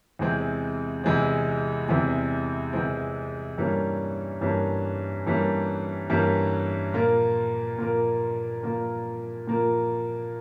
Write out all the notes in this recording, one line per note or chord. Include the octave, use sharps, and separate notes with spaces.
E2 C3 E3 G#3 C4
E2 C3 E3 G#3 C4
E2 C3 E3 G#3 C4
E2 C3 E3 G#3 C4
G2 E3 G3 A#3 C#4
G2 E3 G3 A#3 C#4
G2 E3 G3 A#3 C#4
G2 E3 G3 A#3 C#4
A#2 F3 A#3 F4 A#4
A#2 F3 A#3 F4 A#4
A#2 F3 A#3 F4 A#4
A#2 F3 A#3 F4 A#4